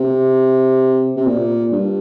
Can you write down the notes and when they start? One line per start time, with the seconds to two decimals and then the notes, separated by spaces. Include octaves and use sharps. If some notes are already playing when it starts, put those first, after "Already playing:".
Already playing: C3
1.17 C3
1.27 A#2
1.72 G2